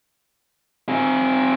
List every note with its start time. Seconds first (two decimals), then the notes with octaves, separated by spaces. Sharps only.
0.89 C4 G#4